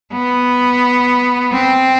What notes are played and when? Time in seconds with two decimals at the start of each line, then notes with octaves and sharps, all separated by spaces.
0.12 B3
1.53 C4